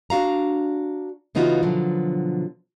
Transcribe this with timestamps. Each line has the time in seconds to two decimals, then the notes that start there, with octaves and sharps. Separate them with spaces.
0.10 D4 F#4 F5 A#5
1.35 C#3 E3 B3 D#4 F4 F#4
1.63 B2 D3 F3 F#3